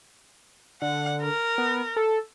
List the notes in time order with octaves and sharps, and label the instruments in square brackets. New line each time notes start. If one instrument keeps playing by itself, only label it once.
[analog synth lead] D3 [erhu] F#5
[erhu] A#4
[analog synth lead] B3
A4